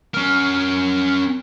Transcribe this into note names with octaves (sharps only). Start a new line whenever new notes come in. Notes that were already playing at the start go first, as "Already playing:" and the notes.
C#4 A#4